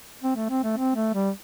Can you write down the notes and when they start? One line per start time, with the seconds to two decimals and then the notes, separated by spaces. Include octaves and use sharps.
0.23 C4
0.36 A3
0.50 C4
0.63 A3
0.77 C4
0.96 A3
1.14 G3